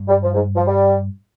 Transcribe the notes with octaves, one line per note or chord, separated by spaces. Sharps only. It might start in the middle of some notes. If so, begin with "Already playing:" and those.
Already playing: G2
G3
F3
G#2
F3
G3